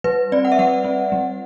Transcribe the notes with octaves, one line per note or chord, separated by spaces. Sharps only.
G3 B4
C4 D5
F#5
E5
G3 F#5
C4
G3